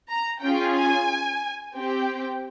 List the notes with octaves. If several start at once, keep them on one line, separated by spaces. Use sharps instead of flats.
A#5
C#4 F4 G#4 G5
G#5
C4 G4 G5